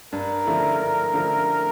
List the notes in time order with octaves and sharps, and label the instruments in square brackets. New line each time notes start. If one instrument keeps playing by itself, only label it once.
[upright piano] G2 [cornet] A#4
[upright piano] D3 F3 A3 E4
G2
D3 F3 A3 E4